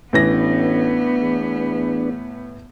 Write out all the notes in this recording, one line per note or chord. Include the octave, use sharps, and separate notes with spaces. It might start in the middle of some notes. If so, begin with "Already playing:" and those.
A1 A2 E3 B3 D4 B4 A#6
E2